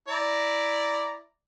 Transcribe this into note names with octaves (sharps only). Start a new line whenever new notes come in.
E4 D5 A#5